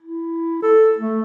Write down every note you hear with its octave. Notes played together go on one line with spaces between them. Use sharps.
E4
A4
A3